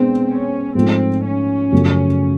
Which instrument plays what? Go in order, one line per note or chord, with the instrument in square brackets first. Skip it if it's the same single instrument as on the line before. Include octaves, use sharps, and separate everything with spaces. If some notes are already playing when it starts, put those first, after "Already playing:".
Already playing: [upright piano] B2 G#3 B3 D4 [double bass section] C4
[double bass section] C#4
[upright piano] G#2 F3 A3 [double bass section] C4
[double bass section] C#4
[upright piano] F#2 C#3 F3 A3